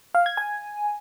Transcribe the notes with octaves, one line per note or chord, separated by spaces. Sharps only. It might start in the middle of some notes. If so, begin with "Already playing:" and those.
F5
G#6
G#5